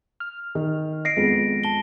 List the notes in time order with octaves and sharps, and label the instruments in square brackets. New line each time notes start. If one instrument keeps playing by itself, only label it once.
[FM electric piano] F6
[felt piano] D#3
[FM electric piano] D#5 [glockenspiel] A#6 C7 D7
[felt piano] F2 [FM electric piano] G#3 B3
[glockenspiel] A5 G7